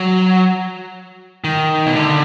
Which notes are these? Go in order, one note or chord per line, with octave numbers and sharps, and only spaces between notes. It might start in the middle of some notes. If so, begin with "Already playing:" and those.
Already playing: F#3
D#3
B2
D3